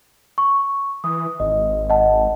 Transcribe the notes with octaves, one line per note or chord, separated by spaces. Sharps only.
C#6
E3 D#6
G#1 D#5
D#5 F#5 A5